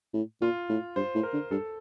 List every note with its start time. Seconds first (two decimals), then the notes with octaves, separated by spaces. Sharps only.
0.13 A2
0.41 A#2 F4
0.69 A2
0.96 G2 C5
1.15 A2
1.23 A#4
1.33 D3
1.51 G2 A4